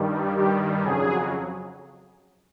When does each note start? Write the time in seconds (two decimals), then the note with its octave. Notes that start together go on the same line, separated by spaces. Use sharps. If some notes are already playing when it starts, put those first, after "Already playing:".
Already playing: G2 D#3 G3
0.36 G2 D#3 G3 G4
0.84 F2 C#3 F#3 G#4